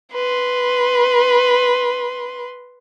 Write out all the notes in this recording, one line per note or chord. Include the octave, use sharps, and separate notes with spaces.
B4 C6